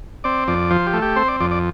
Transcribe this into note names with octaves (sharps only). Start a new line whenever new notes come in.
C4 D5
F2 D5
F3 C5
G4
A3
G4
C4 C5
D5
F2 D5
D5